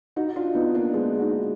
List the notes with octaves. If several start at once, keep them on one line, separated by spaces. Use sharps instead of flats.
D#4 F#4
D4 F4
B3 D#4
A#3 D4
G#3 B3
D#4 F#4